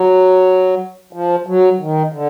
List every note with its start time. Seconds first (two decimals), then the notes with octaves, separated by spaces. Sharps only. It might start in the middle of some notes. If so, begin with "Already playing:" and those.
Already playing: F#3
1.13 F3
1.46 F#3
1.80 D#3
2.12 D3